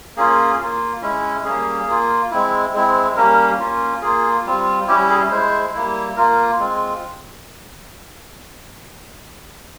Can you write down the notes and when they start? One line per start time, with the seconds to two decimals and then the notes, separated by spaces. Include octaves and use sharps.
0.16 A#3 C#4 F4 G#4
0.60 A#3 F4
1.02 G#3 C#4 E4
1.44 G3 A#3 C#4 G#4
1.87 A#3 F4
2.31 G#3 C4 E4
2.73 G#3 C4 E4
3.16 G3 A#3 C#4 A#4
3.59 A#3 C#4 F4
4.02 A#3 F4 G#4
4.46 G3 C4 F4
4.87 G3 C#4 E4 G4
5.10 G#4
5.31 G#3 E4 C5
5.74 G3 A#3 E4
6.17 A#3 F4 A#4
6.60 G#3 C4 F4